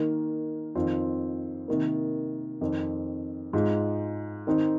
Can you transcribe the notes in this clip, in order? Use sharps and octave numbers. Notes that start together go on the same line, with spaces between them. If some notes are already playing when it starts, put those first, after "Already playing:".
Already playing: D#3 A#3 D#4
F2 D#3 C4 F4
C3 D#3 A#3
F2 D#3 C4
G#2 G#3 F4
D#3 C4 D#4